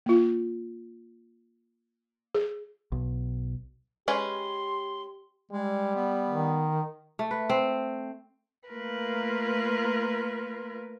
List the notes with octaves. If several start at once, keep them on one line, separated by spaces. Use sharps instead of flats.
A#3 F4
G#4
B1
G#3 C#4 G4 B4 C6
G3 G#3
B3
D#3
A3
B4
C4
A3 A#3 F4 A#4 B4